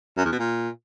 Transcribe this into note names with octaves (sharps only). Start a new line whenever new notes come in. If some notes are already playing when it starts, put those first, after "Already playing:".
F#2
E2
B2
A#2